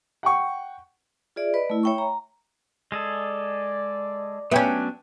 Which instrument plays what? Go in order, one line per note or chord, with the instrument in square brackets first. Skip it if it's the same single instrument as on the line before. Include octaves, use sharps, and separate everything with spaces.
[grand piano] F#5 G5 C#6
[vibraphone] F4 G#4 D5 E5
B4 D5 D#5 B5
A3 E4
C#5 E5 G5 B5 C#6
A#5
[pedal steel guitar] G#3 G#4 A4 [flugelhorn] D5
[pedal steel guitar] F#3 D4 [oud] B3 C#4 [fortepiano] E5 G5 G#5